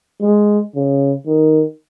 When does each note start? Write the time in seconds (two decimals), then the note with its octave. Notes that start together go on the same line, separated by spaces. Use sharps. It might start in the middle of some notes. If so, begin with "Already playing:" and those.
0.22 G#3
0.75 C#3
1.26 D#3